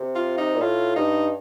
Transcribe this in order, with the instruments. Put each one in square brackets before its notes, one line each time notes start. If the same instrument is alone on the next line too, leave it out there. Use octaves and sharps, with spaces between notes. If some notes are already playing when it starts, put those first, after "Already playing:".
Already playing: [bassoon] C3
[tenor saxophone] F4
D#4
[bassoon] A#2
[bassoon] A2 [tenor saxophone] F4
[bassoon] G2 [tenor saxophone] D#4